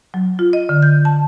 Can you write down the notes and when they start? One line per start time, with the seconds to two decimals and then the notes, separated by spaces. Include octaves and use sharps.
0.14 F#3
0.39 F4
0.53 D#5
0.69 D3
0.82 G6
1.05 A5